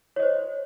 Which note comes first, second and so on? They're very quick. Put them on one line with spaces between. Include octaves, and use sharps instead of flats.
C#5 D#5 C5